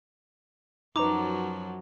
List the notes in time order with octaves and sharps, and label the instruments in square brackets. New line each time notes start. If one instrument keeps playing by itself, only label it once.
[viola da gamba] F#2 F3 F#3 [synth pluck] D#4 B4 [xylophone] A#5 D6